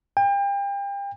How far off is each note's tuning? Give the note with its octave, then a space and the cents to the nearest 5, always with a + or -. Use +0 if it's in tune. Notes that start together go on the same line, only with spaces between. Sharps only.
G5 +35